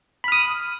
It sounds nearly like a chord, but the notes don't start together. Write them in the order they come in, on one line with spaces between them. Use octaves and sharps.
B5 F6 D#6